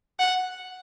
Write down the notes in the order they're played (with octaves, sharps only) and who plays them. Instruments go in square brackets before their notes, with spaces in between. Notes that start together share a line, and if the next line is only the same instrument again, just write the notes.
[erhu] F#5